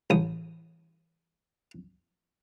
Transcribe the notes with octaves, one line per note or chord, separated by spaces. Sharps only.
A1 D#6